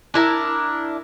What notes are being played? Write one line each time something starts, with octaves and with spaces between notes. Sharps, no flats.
D4 E4 A#4